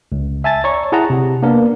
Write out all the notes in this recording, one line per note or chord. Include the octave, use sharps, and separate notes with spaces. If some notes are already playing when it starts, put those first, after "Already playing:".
C#2
E5 G#5 A5 A6
C#5 D5 A#5 C#6
E4 G#4 F#5 A5 A#5
C3
A#3 B3 D4 A#4